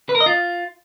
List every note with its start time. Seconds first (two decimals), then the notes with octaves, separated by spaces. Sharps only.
0.09 B4
0.15 A#4
0.20 D#5
0.26 F4